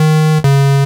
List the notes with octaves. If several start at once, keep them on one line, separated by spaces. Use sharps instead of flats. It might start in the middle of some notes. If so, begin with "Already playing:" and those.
Already playing: D#3
C#3